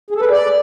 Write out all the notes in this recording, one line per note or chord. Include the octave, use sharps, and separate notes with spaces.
G#4
A4
B4
G#4
D5